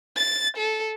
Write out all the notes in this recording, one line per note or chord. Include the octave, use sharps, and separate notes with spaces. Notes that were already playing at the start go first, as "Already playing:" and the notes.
A6
A4